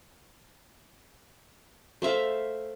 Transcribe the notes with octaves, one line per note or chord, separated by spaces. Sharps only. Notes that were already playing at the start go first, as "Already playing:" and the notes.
A3 C5 E5 F5